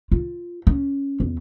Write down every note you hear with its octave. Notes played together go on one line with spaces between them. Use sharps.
F4
C#4
E2